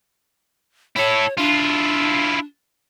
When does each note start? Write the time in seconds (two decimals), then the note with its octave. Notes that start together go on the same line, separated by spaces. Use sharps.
0.96 E4 A4 C#5
1.38 D4 E4 F4